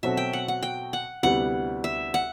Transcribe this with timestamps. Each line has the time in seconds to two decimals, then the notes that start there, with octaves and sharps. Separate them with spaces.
0.03 B2 F#3 C4 F#4 A4 E5
0.17 G5
0.33 F#5
0.48 F#5
0.63 G5
0.93 F#5
1.23 D2 C3 G3 B3 E4 F#5
1.84 E5
2.14 F#5